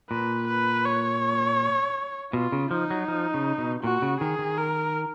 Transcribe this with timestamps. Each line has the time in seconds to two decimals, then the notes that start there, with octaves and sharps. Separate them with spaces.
0.10 A#2 B4
0.48 B4
0.85 C#5
2.33 B2 F4
2.52 C#3
2.71 F3 D#4
2.91 F#3
3.08 F3
3.34 C#3
3.58 B2
3.84 A#2 F#4
4.02 C#3
4.21 D#3 G#4
4.39 D#3
4.58 A#4